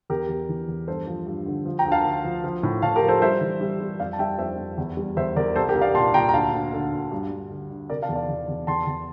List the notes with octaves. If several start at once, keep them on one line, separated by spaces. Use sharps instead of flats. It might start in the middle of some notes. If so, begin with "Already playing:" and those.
E2 G4 A#4
E2
E3
E2
G2 A4 C5
F3
G2
D3
F3
G5 A#5
D2
F5 A5
D2
F3
F3
A2
A2 F5 A5
G4 A#4
F3
A4 C5
G3 C5 E5
E3
G3
G3
F2 D5 F5
A5
G3 E5 G5
F2 C5 E5
F2
E2
G3
E2 C5 E5
E2 A#4 D5
C2 A4 C5
G4 A#4
C2
D5 F5
A#2 A5 C6
A#2 G5 A#5
A#5
D2 F5 A5
D2
D3
D2
G2
G2
D3
D3
C3 A#4 D5
F5 A5
E2
D5 F5
E2
E2
E2 A5 C6
E2